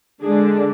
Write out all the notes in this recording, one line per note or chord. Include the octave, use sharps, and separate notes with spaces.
D3 G#3 D4 G#4